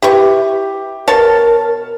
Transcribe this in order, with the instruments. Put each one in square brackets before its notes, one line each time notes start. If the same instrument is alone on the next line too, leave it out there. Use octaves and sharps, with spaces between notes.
[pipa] E4 B4 C#6 [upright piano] G4
[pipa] B2 C#5 A5 [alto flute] A#4